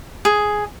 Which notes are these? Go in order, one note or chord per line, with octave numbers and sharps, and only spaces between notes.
G#4